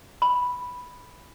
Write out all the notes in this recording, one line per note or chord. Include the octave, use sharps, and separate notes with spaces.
B5